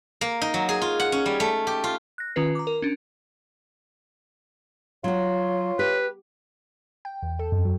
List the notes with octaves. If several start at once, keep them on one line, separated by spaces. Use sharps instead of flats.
A#3
D#4
F#3
G#4
F4
F#5
C#4
G3
A3
G4
F4
F#6 A#6
D#3 C#4 F4 B4 C7
A#5 D6
A#4
C#4 D4
F#3 F4 F#4 C#5
G4 B4
G5
E2
A4
F#2
F#3